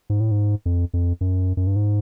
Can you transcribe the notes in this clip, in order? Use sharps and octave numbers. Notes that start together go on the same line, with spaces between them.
G#2
A2
G#2
F2
F2
F#2
F#2
G2
G#2